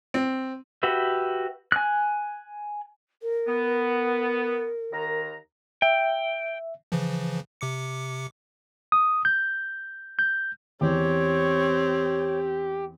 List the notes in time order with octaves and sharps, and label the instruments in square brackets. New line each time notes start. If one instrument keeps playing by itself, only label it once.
[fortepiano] C4
[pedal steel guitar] F#4 G4 B4 E5
G#5 F#6
[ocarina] A#4
[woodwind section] B3
D#2 D#3 A#5
[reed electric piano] E5 [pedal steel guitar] G5
[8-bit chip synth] C#3 E3 F3
C3 D6 C#7
[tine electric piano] D#6
G6
G6
[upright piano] E2 [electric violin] C4 [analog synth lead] G4 [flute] C#5